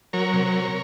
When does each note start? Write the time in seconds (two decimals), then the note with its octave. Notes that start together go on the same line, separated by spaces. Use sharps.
0.13 F#3 A#4 C#5
0.33 C3